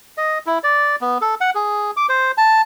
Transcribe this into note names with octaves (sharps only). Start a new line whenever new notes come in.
D#5
E4
D5
B3
A4
F#5
G#4
D6
C5
A5